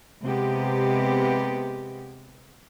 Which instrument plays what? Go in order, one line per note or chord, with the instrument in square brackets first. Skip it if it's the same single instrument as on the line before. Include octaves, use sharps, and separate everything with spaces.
[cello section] C3 G#3 B3 G4